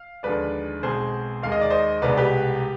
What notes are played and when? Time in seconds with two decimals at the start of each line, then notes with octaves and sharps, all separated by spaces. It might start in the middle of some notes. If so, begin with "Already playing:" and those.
Already playing: F5
0.23 D#2 D3 F3 G#3 B4 D5
0.83 B1 B2 G#3 C4 G#4 C5
1.43 D#2 D#3 G#3 F5
1.52 D#5
1.61 D5
1.70 C5 D#5
2.02 C2 B2 G#3 B3 B4 D5
2.17 G4 B4